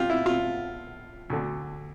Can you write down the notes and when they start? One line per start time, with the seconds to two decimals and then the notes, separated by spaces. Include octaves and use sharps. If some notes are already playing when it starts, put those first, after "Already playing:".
Already playing: F4 G4
0.10 E4
0.26 F4
1.30 D2 D3